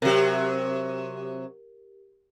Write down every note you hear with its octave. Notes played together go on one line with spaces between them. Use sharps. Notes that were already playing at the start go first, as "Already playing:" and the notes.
C3 F#3 G4 A#4